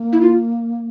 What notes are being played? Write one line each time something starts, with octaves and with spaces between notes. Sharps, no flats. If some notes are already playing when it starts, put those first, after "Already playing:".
Already playing: A#3
E4
F4